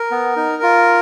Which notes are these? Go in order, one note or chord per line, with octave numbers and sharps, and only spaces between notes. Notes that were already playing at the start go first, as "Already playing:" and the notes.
Already playing: A#4
B3
D#4
F4